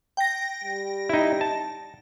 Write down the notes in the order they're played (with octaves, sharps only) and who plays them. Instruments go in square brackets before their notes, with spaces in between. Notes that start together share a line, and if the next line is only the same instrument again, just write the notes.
[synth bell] G5 A#6
[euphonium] G3
[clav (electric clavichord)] D#4 E4
A5